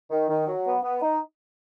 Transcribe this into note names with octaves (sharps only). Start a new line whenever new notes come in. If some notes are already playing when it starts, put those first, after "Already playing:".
D#3
D#3
F#3
B3
B3
D#4